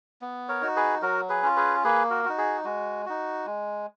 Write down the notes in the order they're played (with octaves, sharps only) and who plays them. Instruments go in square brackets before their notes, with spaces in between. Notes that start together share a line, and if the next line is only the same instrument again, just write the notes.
[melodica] B3
A#4 C#5
D#4 F#4
G#4 B4
F#3 F#4 A#4
G#4 B4
C#4 F4
G#4 B4
A#3 G#4 B4
F#4 A#4
D#4 F#4
G#4
G#3 F#4
D#4 F#4
G#3